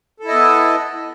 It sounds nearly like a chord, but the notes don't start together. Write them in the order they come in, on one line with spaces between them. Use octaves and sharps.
A4 E4 D#5 B3